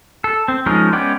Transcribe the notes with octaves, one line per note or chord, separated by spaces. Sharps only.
A4
C4
F3 G#3 C#4 D#4 A#4
G#3 B3 C#4 D5 G5